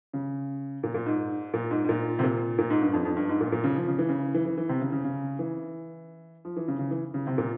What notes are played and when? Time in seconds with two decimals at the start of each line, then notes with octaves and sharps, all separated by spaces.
0.13 C#3
0.83 A#2
0.94 A#2
1.06 G#2
1.54 A#2
1.71 G#2
1.84 G#2
1.89 A#2
2.19 C3
2.23 A#2
2.58 A#2
2.70 G#2
2.81 G2
2.93 F2
3.05 F2
3.17 G2
3.29 G#2
3.41 A#2
3.52 A#2
3.64 C#3
3.76 F3
3.88 C#3
3.98 E3
4.09 C#3
4.34 E3
4.46 E3
4.57 E3
4.69 C3
4.81 C#3
4.92 C#3
5.04 C#3
5.39 E3
6.45 F3
6.56 E3
6.68 C#3
6.79 C#3
6.91 E3
7.14 C#3
7.27 C3
7.38 A#2